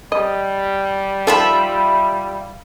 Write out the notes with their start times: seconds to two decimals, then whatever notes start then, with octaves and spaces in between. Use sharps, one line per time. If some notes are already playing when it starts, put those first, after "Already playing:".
0.12 G3 D#5
1.27 D#3 F3 F4 A4 E5 B5